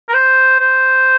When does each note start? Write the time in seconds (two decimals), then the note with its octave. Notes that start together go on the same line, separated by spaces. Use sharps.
0.08 A#4
0.13 C5
0.60 C5